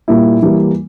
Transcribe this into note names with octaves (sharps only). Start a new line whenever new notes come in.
A#2 G3 A#3 E4
E3 G3 A#3